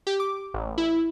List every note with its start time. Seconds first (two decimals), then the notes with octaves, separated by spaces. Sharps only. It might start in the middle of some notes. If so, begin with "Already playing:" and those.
0.07 G4
0.20 D6
0.54 A1
0.78 E4